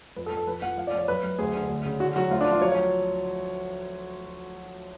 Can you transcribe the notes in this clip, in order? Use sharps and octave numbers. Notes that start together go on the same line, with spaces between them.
F2 B4
A4
F2
A4
F3 B4
F3 F#5
F3 F5
D5
F2
C#5
F#2 B4
F#2
D2 G#4
D3
D2
C#3
D3 F#4
F#3 F#4
D2 F4
D4
F3
F4
F#3 C#5
C#5